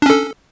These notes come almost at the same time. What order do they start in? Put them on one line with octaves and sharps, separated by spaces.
D4 C#4 A4